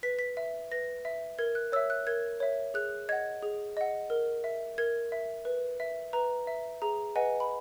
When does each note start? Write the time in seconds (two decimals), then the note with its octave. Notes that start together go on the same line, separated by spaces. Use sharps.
0.03 B4 B6
0.19 B6
0.37 E5
0.71 B4 A#6
1.05 E5
1.39 A#4 G#6
1.55 F#6
1.72 C#5 E6
1.76 E5
1.90 F#6
2.07 A#4 G#6
2.40 C#5 E5
2.74 G#4 F#6
3.09 D#5 F#5 G#6
3.43 G#4
3.77 D#5 F#5
4.10 A#4
4.44 E5
4.78 A#4 G#6
5.12 E5
5.45 B4
5.80 E5
6.13 B4 A#5
6.47 E5
6.82 G#4 A#5
7.16 B4 D#5 F#5 G#5
7.40 B5